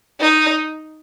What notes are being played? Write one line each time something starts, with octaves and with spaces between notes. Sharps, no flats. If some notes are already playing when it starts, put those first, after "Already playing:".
D#4